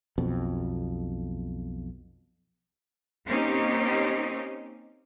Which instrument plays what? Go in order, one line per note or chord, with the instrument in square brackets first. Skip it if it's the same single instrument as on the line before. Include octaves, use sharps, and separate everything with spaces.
[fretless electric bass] B1 F2 B2
[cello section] A#3 C4 C#4 D#4 G4